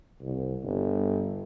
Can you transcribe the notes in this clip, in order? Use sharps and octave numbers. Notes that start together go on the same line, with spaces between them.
C2
G1